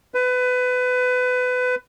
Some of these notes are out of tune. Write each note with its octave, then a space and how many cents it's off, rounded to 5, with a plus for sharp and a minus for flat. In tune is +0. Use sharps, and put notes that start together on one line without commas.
B4 +25